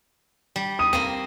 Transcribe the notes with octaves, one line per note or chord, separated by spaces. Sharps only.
G3
D#6 D#7
A#3 C4 D#7